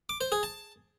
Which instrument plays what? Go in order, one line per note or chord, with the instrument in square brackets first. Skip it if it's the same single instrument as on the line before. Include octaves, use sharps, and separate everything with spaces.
[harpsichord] D6
C5
G#4
A5